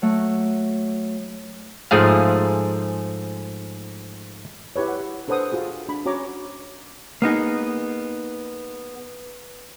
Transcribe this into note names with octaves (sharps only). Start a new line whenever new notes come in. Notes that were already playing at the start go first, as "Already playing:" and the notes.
F#3 A3
G#2 F3 A3 G#4 F5
E4 G4 B4 C#5
F#5
D4 A4 B4 C5 F#5 D#6
F4 F#4 G#4
D4 B5
C#4 F#4 C#5 A#5 D6
A#3 B3 D#4 G#4